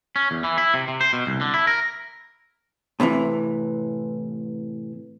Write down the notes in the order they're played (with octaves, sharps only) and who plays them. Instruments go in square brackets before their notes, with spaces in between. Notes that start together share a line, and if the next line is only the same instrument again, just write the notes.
[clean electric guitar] C#4
E2
E3
E4
C3
C3
C5
B2
C2
D3
E4
A#4
[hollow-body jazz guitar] A2 C3 D#3 E3